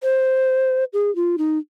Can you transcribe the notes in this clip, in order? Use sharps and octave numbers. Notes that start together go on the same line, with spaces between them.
C5
G#4
F4
D#4